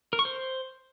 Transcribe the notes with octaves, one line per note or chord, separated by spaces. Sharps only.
A#4
C#6
C5